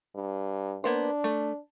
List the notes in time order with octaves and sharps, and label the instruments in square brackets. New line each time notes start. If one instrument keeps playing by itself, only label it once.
[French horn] G2
[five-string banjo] A#3 B3 C5 [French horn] D4
[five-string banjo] A3